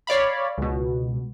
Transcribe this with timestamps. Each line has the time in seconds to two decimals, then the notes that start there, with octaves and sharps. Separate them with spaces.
0.07 C#5 D5 F5 B5
0.58 C#2 B2